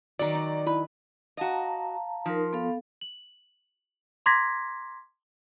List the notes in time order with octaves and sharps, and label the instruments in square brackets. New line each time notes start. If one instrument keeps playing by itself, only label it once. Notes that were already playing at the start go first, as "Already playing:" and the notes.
[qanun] D#3 F#3 [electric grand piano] D5 A#5
[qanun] D#4
[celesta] E4 D5 B5 [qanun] B4
[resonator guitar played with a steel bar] F#4 D#5 [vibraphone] F5 A5 A#5
[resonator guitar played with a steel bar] F3 [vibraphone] D#4 A#4
[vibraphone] B3 A4 F5
[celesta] F#7
A#5 C6 D6 G#6 A#6 B6